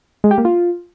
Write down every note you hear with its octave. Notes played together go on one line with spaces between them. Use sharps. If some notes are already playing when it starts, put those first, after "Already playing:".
G#3
G4
A#3
F4